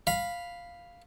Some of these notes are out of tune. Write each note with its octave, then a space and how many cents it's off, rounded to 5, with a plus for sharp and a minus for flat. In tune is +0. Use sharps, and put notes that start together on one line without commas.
F5 +0 B5 +0